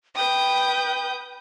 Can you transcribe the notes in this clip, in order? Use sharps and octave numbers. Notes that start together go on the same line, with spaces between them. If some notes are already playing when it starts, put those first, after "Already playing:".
B4 G5 D#6 G6